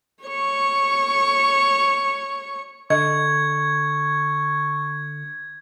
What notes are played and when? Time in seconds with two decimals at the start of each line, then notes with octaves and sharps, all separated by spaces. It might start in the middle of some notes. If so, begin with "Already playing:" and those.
0.24 C#5 C#6
2.90 D3 D#5 C#6 G#6